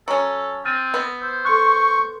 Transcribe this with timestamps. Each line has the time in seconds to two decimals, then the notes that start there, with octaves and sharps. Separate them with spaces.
0.08 F#3 C#4 A4
0.65 C4 F6 A6 D#7
0.94 B3
1.22 C5 E6
1.45 A4 C6 C#6 F#6